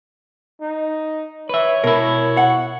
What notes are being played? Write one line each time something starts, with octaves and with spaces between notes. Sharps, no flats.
D#4
B4 C#5 E5
B2 E4 A#4
F#5